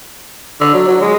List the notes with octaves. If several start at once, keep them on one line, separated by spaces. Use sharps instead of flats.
D3
F#3
F#3
G#3